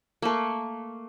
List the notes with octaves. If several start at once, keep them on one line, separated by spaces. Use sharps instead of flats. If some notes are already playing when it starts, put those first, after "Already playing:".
A3 A#3